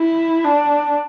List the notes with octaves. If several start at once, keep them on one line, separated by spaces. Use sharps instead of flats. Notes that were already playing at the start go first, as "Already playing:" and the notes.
Already playing: E4
D4